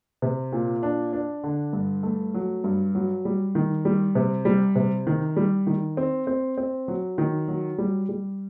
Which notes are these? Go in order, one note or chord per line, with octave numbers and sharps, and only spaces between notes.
C3
A#2
D4
D4
D3
G2
A3
F#3
G2
F#3
G3
D#3
G3
C3
G3
C3
D#3
G3
D#3
C4
C4
C4
F#3
D#3
F#3
G3
G3